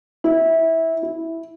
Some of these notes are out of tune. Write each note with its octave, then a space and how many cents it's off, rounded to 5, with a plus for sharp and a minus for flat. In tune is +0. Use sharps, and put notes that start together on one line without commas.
E4 -15
E4 -5